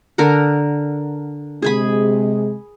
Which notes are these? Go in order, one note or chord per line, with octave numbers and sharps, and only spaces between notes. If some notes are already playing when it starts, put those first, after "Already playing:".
D3 A#4 F#5
C3 G#3 G#4 G#5 B5